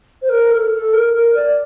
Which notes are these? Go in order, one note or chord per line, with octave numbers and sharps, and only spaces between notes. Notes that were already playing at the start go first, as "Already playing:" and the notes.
C5
A#4
A4
A4
A#4
A#4
D5